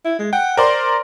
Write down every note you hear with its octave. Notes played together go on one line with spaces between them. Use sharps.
E4
G#3
F#5 G5
A#4 C5 D5 C6